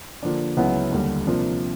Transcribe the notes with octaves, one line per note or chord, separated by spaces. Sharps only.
D3 F3 A#3 D4
C#2 C#3 F#3 B3 E4
D#2 D3 G3
C3 F3 A#3 D4